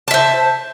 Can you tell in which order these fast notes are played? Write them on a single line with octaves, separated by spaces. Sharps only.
A5 E5 C5